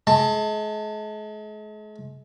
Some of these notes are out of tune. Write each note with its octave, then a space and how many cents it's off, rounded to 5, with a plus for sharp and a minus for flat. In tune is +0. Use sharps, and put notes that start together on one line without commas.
G#3 +40 A5 +20